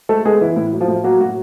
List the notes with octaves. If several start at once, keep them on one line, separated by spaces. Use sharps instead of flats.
G#3 A3 A4
G#3 B3 G#4
E3 E4
A2 E4
F#3
F3 F4
A2
F#3 A#3 F#4
A2 F#4